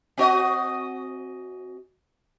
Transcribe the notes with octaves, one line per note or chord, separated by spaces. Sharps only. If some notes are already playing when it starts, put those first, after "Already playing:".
C4 F#4 D#5